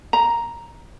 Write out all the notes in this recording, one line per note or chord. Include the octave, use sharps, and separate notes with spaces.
A#5